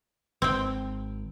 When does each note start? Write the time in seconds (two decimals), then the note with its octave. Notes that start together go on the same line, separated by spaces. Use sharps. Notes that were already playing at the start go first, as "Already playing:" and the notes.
0.42 G#1 C4 G5